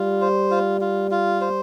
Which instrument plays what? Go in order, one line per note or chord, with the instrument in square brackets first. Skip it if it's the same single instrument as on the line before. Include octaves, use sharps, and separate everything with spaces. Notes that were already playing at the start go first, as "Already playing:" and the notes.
Already playing: [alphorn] G3 [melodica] F4
[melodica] C5
F4
F4
F4
C5